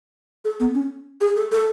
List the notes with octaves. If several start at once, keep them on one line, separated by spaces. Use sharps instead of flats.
A4
B3
C#4
G#4
A4
A4